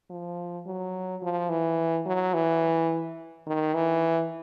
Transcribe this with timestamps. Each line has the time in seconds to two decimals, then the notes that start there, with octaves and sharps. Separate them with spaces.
0.10 F3
0.66 F#3
1.22 F3
1.49 E3
2.06 F#3
2.34 E3
3.47 D#3
3.75 E3